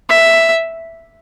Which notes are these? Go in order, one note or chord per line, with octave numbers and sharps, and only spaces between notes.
E5